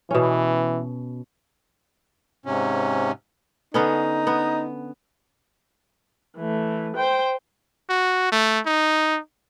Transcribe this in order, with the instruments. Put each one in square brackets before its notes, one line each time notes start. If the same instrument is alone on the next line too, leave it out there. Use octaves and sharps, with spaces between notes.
[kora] B2 C#4 [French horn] E3
[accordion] G#2 C3 C#4
[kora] D3 B3 C#4 [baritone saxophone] D#4
[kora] B3
[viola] E3 A3
C5 G5
[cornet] F#4
A3
D#4